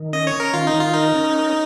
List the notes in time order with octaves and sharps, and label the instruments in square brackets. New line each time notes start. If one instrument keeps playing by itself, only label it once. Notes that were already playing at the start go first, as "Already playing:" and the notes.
Already playing: [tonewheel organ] D#3
[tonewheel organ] C#4 [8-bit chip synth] D#5
[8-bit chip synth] C#5
[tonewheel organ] C#4
[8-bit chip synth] A#4
[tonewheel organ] D#3 [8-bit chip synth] F4
[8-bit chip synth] D#4
[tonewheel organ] D#3
[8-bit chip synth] F4
[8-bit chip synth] D#4 [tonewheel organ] A#4
[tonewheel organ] C#4
A#4